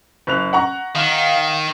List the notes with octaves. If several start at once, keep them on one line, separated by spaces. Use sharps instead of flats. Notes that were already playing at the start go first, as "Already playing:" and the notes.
F#1 F#6 F7
F#5 A#5 C#6
D#3 F5